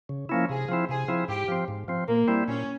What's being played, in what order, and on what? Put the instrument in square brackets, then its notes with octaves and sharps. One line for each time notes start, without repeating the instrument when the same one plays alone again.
[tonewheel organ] C#3
F3 A#3 C#4 E4
[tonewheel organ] C3 [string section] G#4
[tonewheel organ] F3 C4 E4
[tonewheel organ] C3 [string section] G#4
[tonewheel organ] F3 C4 E4
[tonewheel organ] G#2 [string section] G4
[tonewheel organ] F3 C4
G#2
F3 C4
[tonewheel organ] A#2 [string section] A#3
[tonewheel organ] G3 C4 E4
[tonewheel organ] A#2 [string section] C#4